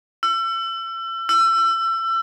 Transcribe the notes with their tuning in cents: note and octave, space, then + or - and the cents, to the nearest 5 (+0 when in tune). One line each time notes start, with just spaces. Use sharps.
E6 +35
E6 +30